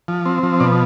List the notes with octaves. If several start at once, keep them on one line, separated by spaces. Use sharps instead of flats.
F3
C4
F3
B2 D5